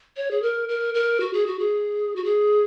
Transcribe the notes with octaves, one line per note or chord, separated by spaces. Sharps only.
C#5
G#4
A#4
A#4
A#4
F#4
G#4
F#4
G#4
F#4
G#4